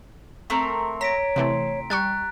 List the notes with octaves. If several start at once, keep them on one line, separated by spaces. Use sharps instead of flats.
A3 C4 A#4
C#5 A#5 A#6 B6 D7
C3 E3 A3 C4
G3 G5 A#5 C#6 F#6 A6